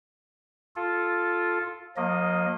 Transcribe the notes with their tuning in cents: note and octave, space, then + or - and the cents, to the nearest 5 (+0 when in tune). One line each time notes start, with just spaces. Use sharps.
F4 +0 A4 -5
F3 +45 A#3 +0 D#5 +0